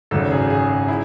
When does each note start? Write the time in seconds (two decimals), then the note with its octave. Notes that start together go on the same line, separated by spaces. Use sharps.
0.11 G#1 F#2 C#3 A4
0.31 G#4
0.50 G#4
0.88 E4